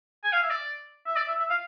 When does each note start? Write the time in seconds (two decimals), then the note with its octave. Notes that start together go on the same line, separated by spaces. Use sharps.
0.24 G#5
0.33 F5
0.42 E5
0.50 D5
1.06 E5
1.16 D5
1.28 E5
1.39 E5
1.50 F5